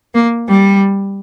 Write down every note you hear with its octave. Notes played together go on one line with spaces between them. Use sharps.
A#3
G3